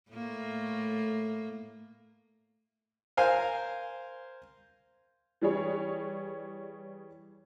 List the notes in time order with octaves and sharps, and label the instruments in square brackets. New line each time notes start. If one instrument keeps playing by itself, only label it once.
[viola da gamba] A2 A3 A#3
[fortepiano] A#4 C5 F5 G#5
[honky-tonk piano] E3 G3 G#4 C#5